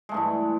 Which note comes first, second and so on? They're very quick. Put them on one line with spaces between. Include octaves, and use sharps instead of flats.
G#3 A3 G2 E3